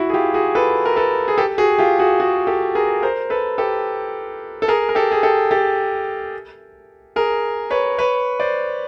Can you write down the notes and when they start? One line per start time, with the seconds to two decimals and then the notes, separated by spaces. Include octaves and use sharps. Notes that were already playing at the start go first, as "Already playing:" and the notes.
Already playing: E4 F#4
0.09 G#4
0.13 F4 G4
0.34 F#4 G#4
0.55 A4 B4
0.85 A#4
0.96 A4 B4
1.28 G#4
1.38 G4 A4
1.58 F#4 G#4
1.78 F4 G4
1.99 F#4 G#4
2.20 F#4 G#4
2.47 G4 A4
2.75 G#4 A#4
3.02 A#4 C5
3.30 A4 B4
3.58 G4 A4
4.62 A4
4.68 G#4 A#4
4.89 A#4
4.95 G4 A4
5.12 G#4
5.23 G4 A4
5.51 G4 A4
7.16 G#4 A#4
7.70 B4 C#5
7.98 B4 C#5
8.40 C5 D5